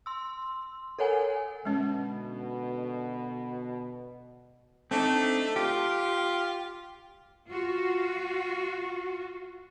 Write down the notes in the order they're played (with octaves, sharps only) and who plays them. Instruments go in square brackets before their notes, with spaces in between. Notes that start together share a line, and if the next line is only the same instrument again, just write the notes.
[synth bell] C6 E6
A4 A#4 C#5 F#5 G#5
[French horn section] B2 D3 [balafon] G#3 C#4
[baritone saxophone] A3 [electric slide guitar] C4 D4 D#4
[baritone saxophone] F4 [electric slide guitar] G4
[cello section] F4 F#4